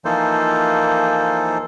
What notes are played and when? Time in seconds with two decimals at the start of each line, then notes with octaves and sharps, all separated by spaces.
0.05 E3 F3 A#3 D#4 A4 C5